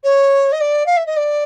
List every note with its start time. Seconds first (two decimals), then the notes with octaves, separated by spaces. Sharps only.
0.04 C#5
0.52 D#5
0.61 D5
0.86 F5
0.97 E5
1.06 D#5
1.16 D5